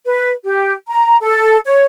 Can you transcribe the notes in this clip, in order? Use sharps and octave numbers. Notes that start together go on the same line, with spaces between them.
B4
G4
A#5
A4
C#5